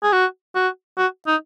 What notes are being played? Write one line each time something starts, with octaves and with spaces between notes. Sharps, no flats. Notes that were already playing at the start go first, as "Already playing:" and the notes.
G#4
F#4
F#4
F#4
D#4